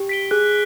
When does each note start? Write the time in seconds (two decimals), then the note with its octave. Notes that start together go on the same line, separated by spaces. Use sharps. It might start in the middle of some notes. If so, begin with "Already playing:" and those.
Already playing: G4
0.09 B6 D7 G7
0.31 G#4 F#6